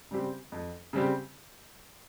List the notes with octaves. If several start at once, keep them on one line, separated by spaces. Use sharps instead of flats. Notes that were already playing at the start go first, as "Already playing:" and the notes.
C#3 G3 C4 G4
F2
C#3 G3 C4 G4